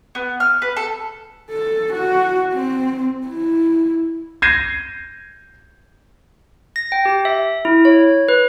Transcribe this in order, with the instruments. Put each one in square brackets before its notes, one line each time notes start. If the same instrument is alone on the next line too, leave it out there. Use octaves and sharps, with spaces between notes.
[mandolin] B3
F6
B4
A4
[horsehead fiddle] A4
F#4
C4
E4
[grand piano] G6 G#6 A#6 C7 D#7 E7
[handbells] A#6
G5
G4
E5
E4
C#5
B4